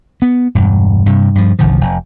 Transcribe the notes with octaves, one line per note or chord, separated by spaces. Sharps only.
B3
E1 G2
G2 C3
G2 F3
G1 C2 D#3 F3
F1